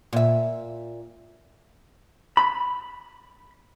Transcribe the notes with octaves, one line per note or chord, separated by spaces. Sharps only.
A#2 E5
B5